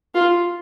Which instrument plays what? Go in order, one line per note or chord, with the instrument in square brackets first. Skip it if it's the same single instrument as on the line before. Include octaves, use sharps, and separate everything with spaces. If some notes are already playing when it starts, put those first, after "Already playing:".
[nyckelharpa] F4